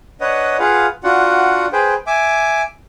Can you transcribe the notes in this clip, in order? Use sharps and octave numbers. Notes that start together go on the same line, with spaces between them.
D4 B4 C#5 D#5 F#5
F4 G#4 B4 F5 F#5
D4 F4 F#4 F#5
G#4 B4 C5 G5
E5 G#5 D6